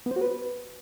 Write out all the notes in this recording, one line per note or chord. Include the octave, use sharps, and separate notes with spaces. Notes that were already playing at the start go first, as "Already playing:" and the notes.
B3
C5
F#4
B4